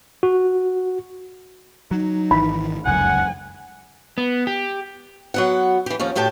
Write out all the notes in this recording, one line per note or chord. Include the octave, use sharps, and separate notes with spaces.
F#4
F#3 D#4
G#1 D#3 E3 B5
F1 C#2 F#2 F#5 G#5
B3
G4
F#3 B3 F#5
E3 G4
D#2 F3 C#4
D2 A2 G4 G5 A5